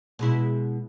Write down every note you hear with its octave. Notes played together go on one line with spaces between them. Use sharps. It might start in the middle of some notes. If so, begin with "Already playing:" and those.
B2 G#3 E4